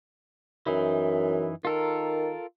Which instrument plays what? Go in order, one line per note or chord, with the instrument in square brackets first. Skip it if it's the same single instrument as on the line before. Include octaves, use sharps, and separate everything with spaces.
[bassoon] F#2 [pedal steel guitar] E3 D#4 E4
[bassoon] D#3 [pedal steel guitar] F4 A4 A#4